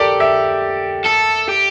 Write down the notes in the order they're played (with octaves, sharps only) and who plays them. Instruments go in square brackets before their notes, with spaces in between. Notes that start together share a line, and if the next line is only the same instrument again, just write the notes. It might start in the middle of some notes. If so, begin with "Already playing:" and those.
Already playing: [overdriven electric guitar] G4 [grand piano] A4 A#4 D5
[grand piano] E5
[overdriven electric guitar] A4
G4